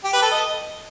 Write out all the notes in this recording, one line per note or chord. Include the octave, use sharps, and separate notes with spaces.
G4
B4
A4
D#5